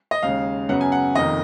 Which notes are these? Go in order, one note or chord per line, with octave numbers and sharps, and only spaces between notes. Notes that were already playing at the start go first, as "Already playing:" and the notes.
D#5
D#2 C#3 G#3 F5
F#2 C#3 F#3 B3 F#5
G#5
F#5
F1 F2 D#3 A#3 D#5